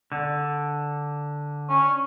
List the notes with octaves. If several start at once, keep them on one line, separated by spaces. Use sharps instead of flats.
D3
C#4